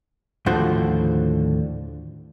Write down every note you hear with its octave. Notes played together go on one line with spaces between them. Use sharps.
D#2 A2 D3 F3 F#4 C5